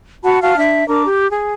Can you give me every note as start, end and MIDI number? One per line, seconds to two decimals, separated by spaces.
0.23 0.41 66
0.23 0.41 78
0.23 0.41 81
0.23 0.41 83
0.42 0.56 66
0.42 0.56 77
0.42 0.56 81
0.42 0.56 89
0.57 0.87 62
0.57 0.87 76
0.87 1.05 62
0.87 1.05 70
0.87 1.05 82
0.87 1.05 86
1.05 1.29 67
1.31 1.53 68